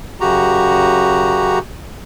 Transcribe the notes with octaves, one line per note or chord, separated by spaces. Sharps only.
F#2 C#3 F#4 G4 A#5